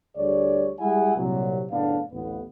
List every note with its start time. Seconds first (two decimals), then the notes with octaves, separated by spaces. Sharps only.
0.17 D2 G3 G#4 C#5 D5
0.79 G3 G#3 E4 G#4 F#5 G#5
1.17 C2 A#2 F#3
1.70 F#1 A2 B3 D4 F5
2.11 A1 D2 B3